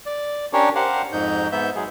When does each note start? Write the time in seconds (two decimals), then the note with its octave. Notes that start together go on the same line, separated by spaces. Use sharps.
0.06 D5
0.53 C#4 D4 G4 A#4 C#5
0.75 G4 A#4 C5 F5 F#5
1.13 F2 G#2 D#4 G6
1.52 G#2 B3 E5 G6
1.76 F#3 G#3 G#4